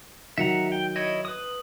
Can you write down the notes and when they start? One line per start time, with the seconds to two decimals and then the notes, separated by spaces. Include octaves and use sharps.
0.38 D#3 F#3 E5 F#5 A#5
0.72 G5
0.96 E4 C#5 D#5
1.25 B4 D#6